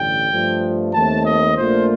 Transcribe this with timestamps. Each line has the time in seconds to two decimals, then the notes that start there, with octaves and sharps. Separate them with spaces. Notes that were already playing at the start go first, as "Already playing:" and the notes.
Already playing: A1 G2 D3 G5
0.30 G2 F3 A3
0.93 D#2 D#3 A3 C4 D#4 A5
1.26 D#5
1.57 A#1 A#2 A3 D4 F4 C5